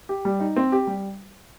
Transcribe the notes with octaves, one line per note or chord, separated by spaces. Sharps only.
G4
G3
D#4
C4
G4
G3